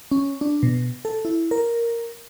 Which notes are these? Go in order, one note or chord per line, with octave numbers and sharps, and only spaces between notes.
C#4
D4
B2
A4
E4
A#4